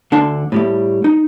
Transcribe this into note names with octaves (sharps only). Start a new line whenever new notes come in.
D2 D3 D4 A5 C6
A2 G3 A3
D#4